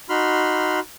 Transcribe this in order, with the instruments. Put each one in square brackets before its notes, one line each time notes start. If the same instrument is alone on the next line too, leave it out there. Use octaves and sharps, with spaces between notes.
[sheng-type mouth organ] D#4 F#4 B5 C6 F6